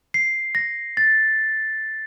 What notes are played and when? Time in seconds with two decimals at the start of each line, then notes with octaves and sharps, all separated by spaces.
0.14 C7
0.55 A#6
0.97 A6